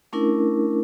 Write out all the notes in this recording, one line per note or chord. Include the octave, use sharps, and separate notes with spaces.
A3 C#4 D4 E4 A#4